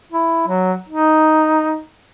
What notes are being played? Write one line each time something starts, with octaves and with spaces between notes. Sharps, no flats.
E4
F#3
D#4